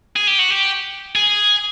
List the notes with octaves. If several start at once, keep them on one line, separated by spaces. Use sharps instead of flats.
G#4
G4
F#4
G4
G#4